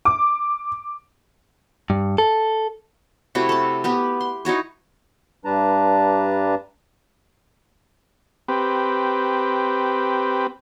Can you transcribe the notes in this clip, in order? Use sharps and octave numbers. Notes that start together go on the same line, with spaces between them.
D6
G2
A4
C3 A3 E4 F#4
A4 A5
B3 G4 B4
C6
D#4 E4 F#4 C#5
G2 G3 D4 B4 A5 A#5
C4 G4 B4